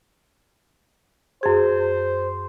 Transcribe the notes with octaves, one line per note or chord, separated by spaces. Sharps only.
F#2 G#4 C5